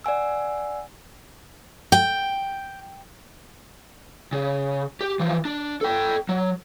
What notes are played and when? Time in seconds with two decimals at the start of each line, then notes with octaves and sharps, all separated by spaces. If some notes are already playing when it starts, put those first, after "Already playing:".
0.04 D5 F#5 G#5 E6
1.92 G5
4.33 C#3
5.01 G4
5.20 E3 F3
5.45 D4
5.81 A4 G5
6.29 F#3